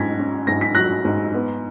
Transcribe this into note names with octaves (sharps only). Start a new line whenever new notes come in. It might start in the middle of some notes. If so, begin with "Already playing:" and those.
Already playing: G#2 C#4 G#6 A#6 B6
C#4
G#2 A#6
B6
F#3 F#6 A#6
G#2
B3